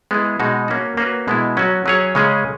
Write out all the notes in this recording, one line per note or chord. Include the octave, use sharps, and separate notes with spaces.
G#3 B3 E4 G#4
B2 G#3 D#4 F#4
A#3 C#4 F#4
A#3 C#4 F#4 B4
B2 G#3 B3 E4
F#3 C#4 F#4
F#3 C#4 G#4 C#5
C#3 G#3 C#4 G#4